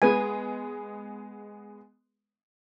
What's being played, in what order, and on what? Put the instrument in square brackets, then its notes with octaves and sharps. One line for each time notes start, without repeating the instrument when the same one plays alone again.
[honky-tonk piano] G#3 B3 G#4 [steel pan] B4 G#5